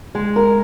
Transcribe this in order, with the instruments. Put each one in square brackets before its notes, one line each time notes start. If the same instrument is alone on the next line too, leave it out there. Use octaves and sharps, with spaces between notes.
[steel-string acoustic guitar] G#3
A#4